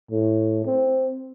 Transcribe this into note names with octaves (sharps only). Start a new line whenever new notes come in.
A2
C4